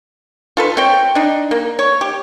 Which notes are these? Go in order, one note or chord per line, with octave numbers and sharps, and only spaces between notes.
F4 A4 B4
C4 C#5 G5
D4 D#4
A#3
C#5
G4